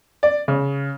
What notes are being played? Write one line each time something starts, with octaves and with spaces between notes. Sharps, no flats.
D5
C#3